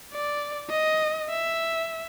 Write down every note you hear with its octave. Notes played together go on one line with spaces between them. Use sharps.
D5
D#5
E5